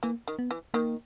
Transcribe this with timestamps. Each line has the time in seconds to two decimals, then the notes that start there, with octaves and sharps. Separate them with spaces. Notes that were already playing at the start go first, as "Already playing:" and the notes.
0.03 E3 A#3
0.28 D#3
0.39 B3
0.51 E3
0.74 D#3 A#3